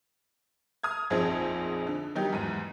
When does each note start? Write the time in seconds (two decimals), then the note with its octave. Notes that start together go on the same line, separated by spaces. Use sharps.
0.83 D#6 F6 G#6
1.10 A#1 F2 C4 D#4 G#4 G#6
1.87 D3
2.15 D#3 F#3 G3 D#4 G4
2.33 E2 G#2 D#7